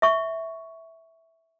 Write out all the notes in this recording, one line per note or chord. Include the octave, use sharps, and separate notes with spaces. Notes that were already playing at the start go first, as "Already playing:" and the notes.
E5 C#6